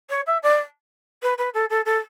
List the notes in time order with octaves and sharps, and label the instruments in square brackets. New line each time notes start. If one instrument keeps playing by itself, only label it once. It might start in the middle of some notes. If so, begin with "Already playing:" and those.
[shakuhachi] C#5
E5
D5
B4
B4
A4
A4
A4